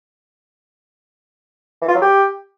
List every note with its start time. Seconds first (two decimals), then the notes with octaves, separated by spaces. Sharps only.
1.81 E3
1.88 F4
1.95 F#3
2.02 G4